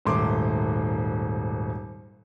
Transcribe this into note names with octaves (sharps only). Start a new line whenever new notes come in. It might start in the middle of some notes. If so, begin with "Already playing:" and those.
D#1 G#1 A3 C6 D6